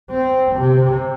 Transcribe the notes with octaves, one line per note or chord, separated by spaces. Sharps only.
C4
C3